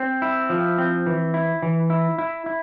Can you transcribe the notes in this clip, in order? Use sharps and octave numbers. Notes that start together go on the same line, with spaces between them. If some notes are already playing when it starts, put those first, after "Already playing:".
Already playing: C4
E4
F3
C4
E3
E4
E3
E4
E4
E4